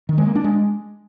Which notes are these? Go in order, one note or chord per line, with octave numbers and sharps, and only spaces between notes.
D#3
G#3
A#3
D4
G#3